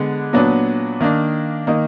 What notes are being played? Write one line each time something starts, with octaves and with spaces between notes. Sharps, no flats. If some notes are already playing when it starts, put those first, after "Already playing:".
Already playing: D3 G#3 B3
A#2 F#3 B3 D4
D#3 A#3 D4
D#3 A#3 D#4